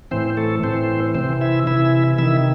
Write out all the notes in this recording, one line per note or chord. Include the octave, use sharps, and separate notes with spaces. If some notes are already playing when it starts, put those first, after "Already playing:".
A2 E3 C4 C5
A3 A4
A2 E3 C4 C5
C3 E3 C4 C5
E4 E5
C3 E3 E4 E5
C3 D#3 E4 E5